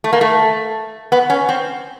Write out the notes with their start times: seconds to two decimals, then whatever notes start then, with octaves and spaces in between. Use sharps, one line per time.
0.04 A3
0.13 A#3
0.21 A3
1.12 B3
1.30 C#4
1.49 C4